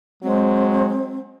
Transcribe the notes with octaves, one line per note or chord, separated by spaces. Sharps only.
F#3 G#3 C4